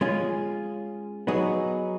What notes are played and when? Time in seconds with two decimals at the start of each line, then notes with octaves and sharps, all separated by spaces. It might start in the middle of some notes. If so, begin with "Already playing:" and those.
0.01 G#3 C#4 F4 G#4
1.27 F#3 B3 D#4 G#4